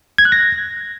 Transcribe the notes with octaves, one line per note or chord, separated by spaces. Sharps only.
G#6
F#6
A#6